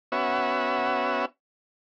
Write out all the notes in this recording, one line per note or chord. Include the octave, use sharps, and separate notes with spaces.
B3 C#4 F#4 E5